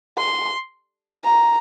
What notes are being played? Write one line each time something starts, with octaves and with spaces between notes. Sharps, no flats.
C6
A#5